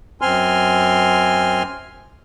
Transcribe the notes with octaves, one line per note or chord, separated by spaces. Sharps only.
F#2 C4 G#5 C6 F6